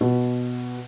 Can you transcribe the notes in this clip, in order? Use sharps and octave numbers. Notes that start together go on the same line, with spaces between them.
B2